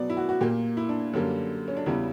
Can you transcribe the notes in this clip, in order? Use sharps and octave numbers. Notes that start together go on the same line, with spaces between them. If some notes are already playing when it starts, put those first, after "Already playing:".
Already playing: B2 F#3 B3 D5
E4
F#4
F#4
A#2 A#3 G4
E4
D4
F#2 D3 G3 A#3
C#4
D4
E2 C#3 G3 E4